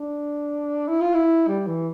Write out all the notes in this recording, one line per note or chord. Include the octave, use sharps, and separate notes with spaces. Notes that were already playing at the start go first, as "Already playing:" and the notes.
Already playing: D4
E4
F4
E4
G3
E3